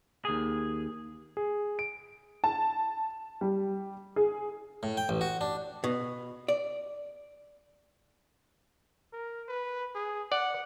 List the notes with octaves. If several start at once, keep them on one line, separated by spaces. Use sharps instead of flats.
D#2 G#4
G#4
D7
A5
G3
G#4
A2
G5
A1
F#4
D4
B2
D5
A#4
B4
G#4
D5 F#5